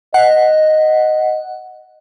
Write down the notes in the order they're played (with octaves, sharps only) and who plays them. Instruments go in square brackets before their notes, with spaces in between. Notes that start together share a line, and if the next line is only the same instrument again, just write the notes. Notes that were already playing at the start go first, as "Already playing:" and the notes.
[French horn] D#5 [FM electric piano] F#5